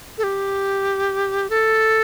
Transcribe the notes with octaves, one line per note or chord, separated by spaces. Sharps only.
A4
G4
A4